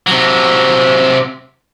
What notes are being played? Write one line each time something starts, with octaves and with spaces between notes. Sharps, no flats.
C3 F#3